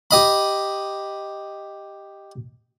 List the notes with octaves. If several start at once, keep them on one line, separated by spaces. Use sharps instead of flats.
G4 D#5 B5